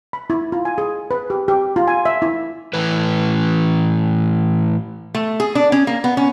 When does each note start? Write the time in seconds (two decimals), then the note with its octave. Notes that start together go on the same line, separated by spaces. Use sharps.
0.13 B5
0.30 E4
0.52 F4
0.65 G#5
0.78 G#4
1.11 B4
1.30 G4
1.48 G4
1.76 F4
1.88 G#5
2.05 E5
2.22 E4
2.73 A2 E3 E4 B4
5.15 A3
5.40 G#4
5.55 D4
5.72 C#4
5.87 A#3
6.04 B3
6.17 C#4